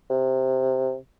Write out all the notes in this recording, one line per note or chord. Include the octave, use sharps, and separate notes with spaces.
C3